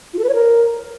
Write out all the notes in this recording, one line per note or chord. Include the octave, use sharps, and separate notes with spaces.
F4
A4
B4
C#5
A#4